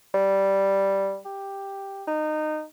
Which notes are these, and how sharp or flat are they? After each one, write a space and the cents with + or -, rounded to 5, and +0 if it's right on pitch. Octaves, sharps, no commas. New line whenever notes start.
G3 -5
G4 +5
D#4 -20